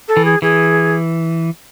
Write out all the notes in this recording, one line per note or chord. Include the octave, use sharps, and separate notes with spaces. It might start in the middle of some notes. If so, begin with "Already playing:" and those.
A4
E3
G#4
E3 G#4